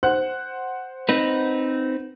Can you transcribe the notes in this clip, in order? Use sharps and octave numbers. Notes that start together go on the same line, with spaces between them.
C5 F#5 F#6
C4 D#4 B4